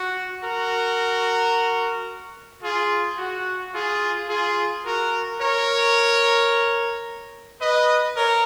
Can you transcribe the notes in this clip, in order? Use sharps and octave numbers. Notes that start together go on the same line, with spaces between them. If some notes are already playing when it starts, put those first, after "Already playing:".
Already playing: F#4
F#4 A#4
F4 G#4
F#4
F4 G#4
F4 G#4
F#4 A#4
A#4 C#5
B4 D#5
A#4 C#5